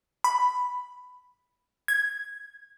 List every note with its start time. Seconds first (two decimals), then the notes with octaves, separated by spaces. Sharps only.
0.24 B5
1.88 G#6